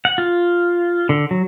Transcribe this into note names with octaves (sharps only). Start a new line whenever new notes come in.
F#5
F4
D3
F#3